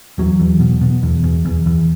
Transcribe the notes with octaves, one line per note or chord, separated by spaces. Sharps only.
E2 F#3
E2
B2
B2
E2
E2
E2
E2